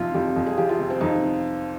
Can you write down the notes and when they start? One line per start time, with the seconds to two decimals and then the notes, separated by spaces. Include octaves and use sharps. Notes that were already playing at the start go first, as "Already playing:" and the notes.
Already playing: F2 C3 F3 D#4 F4
0.14 F2 G4
0.36 F2
0.46 G#4
0.58 F3 G4
0.69 F4
0.79 C3
0.90 C4
1.01 F2 D#4